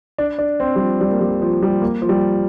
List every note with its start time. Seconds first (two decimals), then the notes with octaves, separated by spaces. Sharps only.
0.18 D4
0.39 D4
0.60 C4
0.76 G3
0.79 F3
1.01 G3
1.11 A#3
1.21 G3
1.42 F3
1.63 G3
1.82 A#3
2.02 F3
2.09 G3